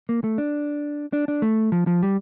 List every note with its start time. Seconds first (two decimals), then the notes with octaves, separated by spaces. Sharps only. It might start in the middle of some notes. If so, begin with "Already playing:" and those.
0.09 A#3
0.24 A3
0.38 D4
1.13 D4
1.28 D4
1.42 A3
1.72 F3
1.87 F3
2.03 G3